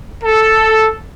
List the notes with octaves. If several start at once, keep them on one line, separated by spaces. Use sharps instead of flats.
A4